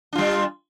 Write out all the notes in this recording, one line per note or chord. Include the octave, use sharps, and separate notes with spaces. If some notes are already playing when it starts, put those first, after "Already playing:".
G3 D4 F4